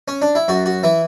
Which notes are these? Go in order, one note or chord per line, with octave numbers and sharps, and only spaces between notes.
C#4
D4
E4
F#2 F#4
F#4
E3 E4